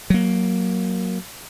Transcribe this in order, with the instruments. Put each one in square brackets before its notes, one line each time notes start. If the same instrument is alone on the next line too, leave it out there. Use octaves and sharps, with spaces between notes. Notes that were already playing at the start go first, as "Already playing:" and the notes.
[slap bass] F#3 A#3